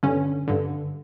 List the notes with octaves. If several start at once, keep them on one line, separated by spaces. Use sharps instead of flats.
G2 D3 C#4
G2 D3